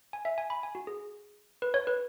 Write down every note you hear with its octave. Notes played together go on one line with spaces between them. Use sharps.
G#5
E5
G#5
B5
G#5
F#4
G#4
B4
C#5
B4